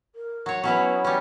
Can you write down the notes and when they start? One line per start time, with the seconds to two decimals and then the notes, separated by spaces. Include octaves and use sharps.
0.16 A#4
0.46 F#3 C#5
0.64 F#3 B3 C#4 E4
1.04 G3 C#4